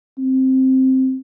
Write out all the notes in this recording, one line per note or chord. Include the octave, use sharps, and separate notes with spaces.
C4